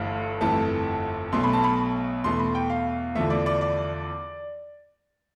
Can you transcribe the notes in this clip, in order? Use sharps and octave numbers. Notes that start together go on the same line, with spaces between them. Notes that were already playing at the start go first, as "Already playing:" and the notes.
Already playing: G1 G2 E3 A3 F5
G1 F2 E3 A3 A5
B1 B2 A3 C6
B5
A5
B5
E2 B2 A3 C6
B5
G5
F5
E2 D3 F3 A3 E5
D5
D5
D5